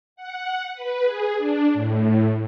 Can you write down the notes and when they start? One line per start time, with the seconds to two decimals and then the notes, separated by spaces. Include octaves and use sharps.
0.16 F#5
0.73 B4
1.04 G#4
1.37 D4
1.74 A2